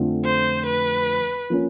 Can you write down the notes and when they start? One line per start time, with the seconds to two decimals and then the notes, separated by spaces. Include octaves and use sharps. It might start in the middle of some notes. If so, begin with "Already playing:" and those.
Already playing: F2 D3 F3 A3 C4
0.25 C5
0.66 B4
1.50 F3 A#3 C#4